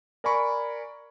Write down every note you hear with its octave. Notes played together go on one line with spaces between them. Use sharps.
A#4 D5 G#5 A#5 B5 C#6